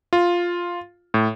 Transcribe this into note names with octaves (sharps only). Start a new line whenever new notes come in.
F4
A2